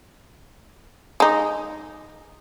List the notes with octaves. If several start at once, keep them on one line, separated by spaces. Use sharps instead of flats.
G#3 D#4